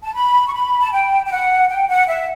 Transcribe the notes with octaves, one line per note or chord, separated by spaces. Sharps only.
A5
B5
C#6
B5
A5
G5
G5
F#5
G5
F#5
E5